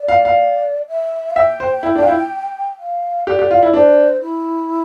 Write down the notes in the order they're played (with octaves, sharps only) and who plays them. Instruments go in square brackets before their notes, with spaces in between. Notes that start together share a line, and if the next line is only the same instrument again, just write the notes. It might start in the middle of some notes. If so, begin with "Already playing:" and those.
Already playing: [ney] D5
[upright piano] F5
F5
[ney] E5
F5
[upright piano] E5 [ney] G5
[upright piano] C5
E4
D4
F4
E4
[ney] F5
[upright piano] G4 [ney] D5
[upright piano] G4
F4
E4
[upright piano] D4 [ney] C5
[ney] E4